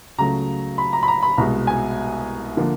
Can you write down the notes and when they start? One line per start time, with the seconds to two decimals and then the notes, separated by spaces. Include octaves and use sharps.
0.18 C#2 C#3 F#3 A3 A#5
0.78 B5
0.93 A#5
1.03 B5
1.08 A#5
1.23 B5
1.38 C2 B2 G#3 A#5
1.67 G#5
2.57 D3 F3 A#3